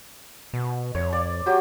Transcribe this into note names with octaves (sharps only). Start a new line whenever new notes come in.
B2
F2 C#5
D5
F#3 G4 C#6